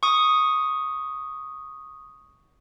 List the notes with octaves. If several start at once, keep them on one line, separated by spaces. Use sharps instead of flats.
C#6 D#6